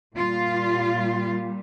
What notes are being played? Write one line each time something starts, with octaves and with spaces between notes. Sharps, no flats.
A#2 G3 F4